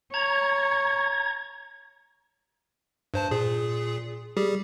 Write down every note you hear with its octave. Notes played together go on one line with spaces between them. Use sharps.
C#5 A#5 G#6
G2 C5 A5
A#2 G#4
G3 G4 G#4